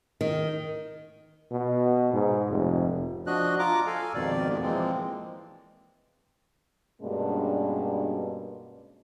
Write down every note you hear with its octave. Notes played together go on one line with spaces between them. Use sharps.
D#3
B2
G#2
F1
F3 D4 F#4 D#5 F#6
F4 A#5 D6
A4 F5 G#5
F2 G#2 B2 D#3 D5
G#2 B2 D#3 F3 G#3 A#3
E3 F3 G#3 A#3 C4
G2 B2 G#3 A#3 C#4 D4